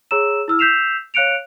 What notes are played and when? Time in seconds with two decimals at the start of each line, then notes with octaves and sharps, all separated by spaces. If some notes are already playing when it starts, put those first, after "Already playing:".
0.11 G#4 C#5 A#5 E6 E7
0.48 E4 E6 F6
0.59 E6 G6 B6 C7 E7 F7
1.14 C#5 F5 F#6 C#7 D7 F7